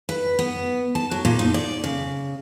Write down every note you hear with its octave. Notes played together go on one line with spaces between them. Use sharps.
B4
B3
A5
F#3
A#2
D#4
D5
C#3